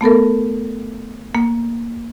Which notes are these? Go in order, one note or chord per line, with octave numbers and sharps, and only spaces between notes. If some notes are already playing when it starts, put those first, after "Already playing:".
A3 B3 A4 A#4
A#3